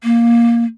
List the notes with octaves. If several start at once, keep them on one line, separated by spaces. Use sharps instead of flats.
A#3